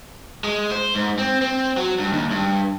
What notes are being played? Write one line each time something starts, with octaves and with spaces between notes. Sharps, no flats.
G#3
C5
G#2
C4
C4
F#3
G2
D#2
G2